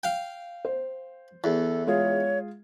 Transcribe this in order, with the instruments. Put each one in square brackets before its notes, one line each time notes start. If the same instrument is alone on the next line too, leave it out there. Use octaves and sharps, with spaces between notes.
[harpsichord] F5 G5
[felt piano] C5
[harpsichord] E2 [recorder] A4
[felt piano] G#3 F4 G#4 [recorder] C#5